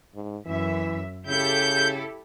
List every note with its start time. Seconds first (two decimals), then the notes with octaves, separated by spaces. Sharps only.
0.15 G#2
0.46 F#2 E3 E5
1.27 C#3 E4 G4 A4 G6